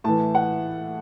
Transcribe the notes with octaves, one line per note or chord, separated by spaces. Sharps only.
A2 E3 A5
F#5